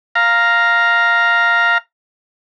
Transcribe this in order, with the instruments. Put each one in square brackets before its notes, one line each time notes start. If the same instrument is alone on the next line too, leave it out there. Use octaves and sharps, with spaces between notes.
[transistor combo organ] F5 A#5